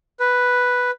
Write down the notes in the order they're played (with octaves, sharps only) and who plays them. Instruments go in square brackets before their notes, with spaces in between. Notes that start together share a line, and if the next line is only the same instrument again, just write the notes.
[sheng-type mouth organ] B4